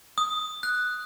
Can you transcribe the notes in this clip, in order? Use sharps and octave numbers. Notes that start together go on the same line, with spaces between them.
D#6
F#6